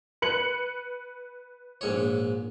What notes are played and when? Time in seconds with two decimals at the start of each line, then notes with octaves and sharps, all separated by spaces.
0.22 B4 C#7 F#7
1.81 A#1 G#2 C#5